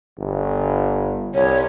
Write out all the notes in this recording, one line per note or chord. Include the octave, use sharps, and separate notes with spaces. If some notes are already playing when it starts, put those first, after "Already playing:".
G1
C2 C#5